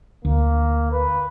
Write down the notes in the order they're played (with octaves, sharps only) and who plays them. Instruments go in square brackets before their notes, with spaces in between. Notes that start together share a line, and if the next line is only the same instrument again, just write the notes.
[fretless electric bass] D2 [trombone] A#3
[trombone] B4